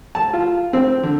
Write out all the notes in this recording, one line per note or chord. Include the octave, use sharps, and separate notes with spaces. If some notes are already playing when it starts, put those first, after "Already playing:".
A5
F4
C4
D3